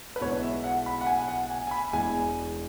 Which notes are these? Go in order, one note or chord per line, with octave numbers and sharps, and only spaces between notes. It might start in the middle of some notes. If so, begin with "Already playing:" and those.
B4
B1 B2 G#3 B3 E4 C#5
E5
F#5
B5
F#5
G#5
F#5
G#5
G#5
B5
E1 E2 B2 G#3 E4 G#5